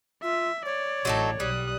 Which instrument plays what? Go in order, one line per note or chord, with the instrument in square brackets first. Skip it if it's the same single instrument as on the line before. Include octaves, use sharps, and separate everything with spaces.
[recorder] F4 [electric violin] E5
[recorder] C#5 [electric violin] D5
[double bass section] A1 [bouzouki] F#3 D#4 A4
[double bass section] B1 [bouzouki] G3 [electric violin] D#6 F#6